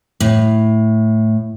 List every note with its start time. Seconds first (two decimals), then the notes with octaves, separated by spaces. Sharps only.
0.20 A2